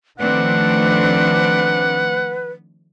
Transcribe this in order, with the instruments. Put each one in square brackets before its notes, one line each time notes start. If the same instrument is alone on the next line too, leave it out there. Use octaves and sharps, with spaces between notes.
[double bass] D#3 F3 [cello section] A3 C4 D4 [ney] B4 [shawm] F#5